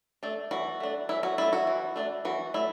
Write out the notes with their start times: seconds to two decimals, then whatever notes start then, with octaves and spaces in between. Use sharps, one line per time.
0.23 A3 D4
0.51 E3 F#4
0.80 A3 D4
1.09 E3 E4
1.23 F#4
1.38 A3 D4 E4
1.53 F#4
1.67 E3
1.96 A3 D4
2.25 E3 F#4
2.54 A3 E4